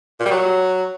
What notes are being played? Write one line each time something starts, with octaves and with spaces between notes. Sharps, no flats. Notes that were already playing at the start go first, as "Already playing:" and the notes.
A#2
G3
F#3